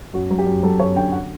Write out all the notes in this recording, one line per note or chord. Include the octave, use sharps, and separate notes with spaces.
F#2 F#4
F#3
G4
F#2
F#3 A4
F#2 C#5
D3 G5
F#5